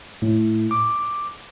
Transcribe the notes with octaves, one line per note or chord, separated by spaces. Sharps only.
A2
D6